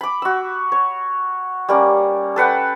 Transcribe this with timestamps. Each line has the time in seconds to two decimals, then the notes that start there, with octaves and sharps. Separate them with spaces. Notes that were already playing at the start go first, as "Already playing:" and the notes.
0.01 B5 D6
0.22 F#4 E6
0.72 C#5
1.69 G3 A#3 C#4
2.36 A4 B4 F#5 G5